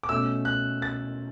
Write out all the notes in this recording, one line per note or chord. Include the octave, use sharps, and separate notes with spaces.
D6
B2 A3 C#4 E6
F#6
A6